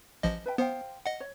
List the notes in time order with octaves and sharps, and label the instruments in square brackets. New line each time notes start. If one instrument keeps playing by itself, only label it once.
[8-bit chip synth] A1 F3 D#5
[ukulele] B4 E5 G5
[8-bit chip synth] B3 [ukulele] C5 F5 G5
[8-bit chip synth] D#5 F#5
[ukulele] C#5